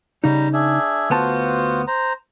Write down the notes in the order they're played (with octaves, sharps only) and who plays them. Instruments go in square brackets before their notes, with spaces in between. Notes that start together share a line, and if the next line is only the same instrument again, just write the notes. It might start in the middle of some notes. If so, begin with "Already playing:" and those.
[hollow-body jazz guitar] C#3 D#4 [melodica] G3 A#5
[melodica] D4 G#4 E5
[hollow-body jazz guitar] D2 B3 A5 [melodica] F4 F#4 C5
[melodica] C5 A#5